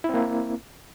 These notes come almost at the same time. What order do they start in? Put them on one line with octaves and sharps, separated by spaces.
E4 C4 A#3